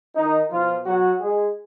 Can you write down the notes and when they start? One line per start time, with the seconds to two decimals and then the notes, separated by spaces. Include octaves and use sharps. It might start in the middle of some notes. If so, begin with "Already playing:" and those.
0.15 D#3 D#4
0.50 B2 F3 F4
0.86 F#3 F#4
1.21 G#3 G#4